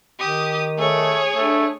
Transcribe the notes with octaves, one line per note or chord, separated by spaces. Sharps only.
D#3 G4 D#6
A3 G#4 C#5
A3 D4